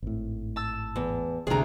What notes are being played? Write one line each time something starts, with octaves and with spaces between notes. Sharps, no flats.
G#1 A2
A5 E6
E2
G#1 D2 C3 G#4 A#5